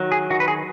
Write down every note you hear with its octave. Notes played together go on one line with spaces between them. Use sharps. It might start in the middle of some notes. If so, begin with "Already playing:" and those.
Already playing: D#3 F#3
G#4
D#3 F#4
B4
G#4